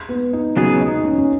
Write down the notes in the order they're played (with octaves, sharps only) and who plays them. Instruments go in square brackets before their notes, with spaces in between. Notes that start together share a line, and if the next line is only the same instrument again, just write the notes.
[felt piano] B3
D#4
[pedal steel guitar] C#3 F#3 B3 G#4 [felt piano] F#4
[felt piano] D#4
C#4
C#4